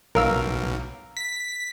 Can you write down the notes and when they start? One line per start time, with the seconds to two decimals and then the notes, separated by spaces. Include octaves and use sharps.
0.15 B1 A#4 F5 E6
1.17 B6